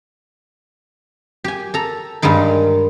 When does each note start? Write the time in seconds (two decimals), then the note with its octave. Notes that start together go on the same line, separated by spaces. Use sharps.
1.44 G4 G#5
1.74 A4 A#5
2.22 G2 D#3 G3 G#3 D#4